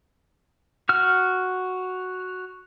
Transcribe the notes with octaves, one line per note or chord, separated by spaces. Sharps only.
F#4 F6